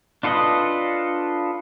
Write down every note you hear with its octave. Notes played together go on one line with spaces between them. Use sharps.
D4 F4 A4 B4 D#5